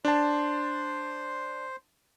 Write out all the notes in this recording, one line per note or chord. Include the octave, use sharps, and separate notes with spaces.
D4 C5 A5 C6